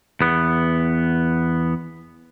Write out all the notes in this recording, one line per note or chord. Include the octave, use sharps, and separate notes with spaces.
E2 B3